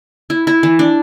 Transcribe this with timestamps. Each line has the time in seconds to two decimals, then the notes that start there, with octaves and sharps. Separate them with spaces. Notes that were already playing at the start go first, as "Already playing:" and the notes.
0.30 E4
0.47 E4
0.63 E3
0.79 D4